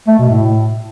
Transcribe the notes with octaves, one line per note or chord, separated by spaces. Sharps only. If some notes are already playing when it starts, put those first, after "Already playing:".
A3
B2
A2